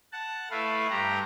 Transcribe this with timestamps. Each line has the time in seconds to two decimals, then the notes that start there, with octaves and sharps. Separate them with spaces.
0.13 F#5 A5
0.51 A3 E4 B4 F5
0.90 G2 G4 A#5